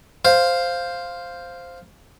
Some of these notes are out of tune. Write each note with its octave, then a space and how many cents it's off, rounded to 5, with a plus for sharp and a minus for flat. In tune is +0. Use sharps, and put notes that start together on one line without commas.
C5 +0 F5 +0